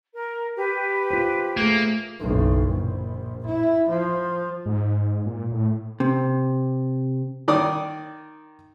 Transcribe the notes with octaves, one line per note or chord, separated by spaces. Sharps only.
A#4
G4 B4
F4 C5
A3 A#3 G#4
F#1 B1
A#1
E4
F3
G#2
A#2
A2
C3
D#3 D5 D#6